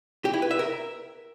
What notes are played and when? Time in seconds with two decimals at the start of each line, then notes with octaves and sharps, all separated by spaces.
0.25 G4
0.34 E4
0.42 B4
0.51 E5
0.59 A#4